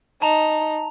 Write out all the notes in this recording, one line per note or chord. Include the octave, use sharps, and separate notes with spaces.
D#4 A5 A#5 F7